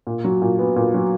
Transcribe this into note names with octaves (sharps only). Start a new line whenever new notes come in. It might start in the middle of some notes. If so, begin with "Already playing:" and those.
A#2
F#3
A#2
B3
A#2
F#3